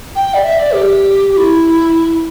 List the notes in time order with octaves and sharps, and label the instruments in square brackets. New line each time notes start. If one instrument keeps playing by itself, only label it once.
[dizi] G5
D5
E5
D5
G4
G4
E4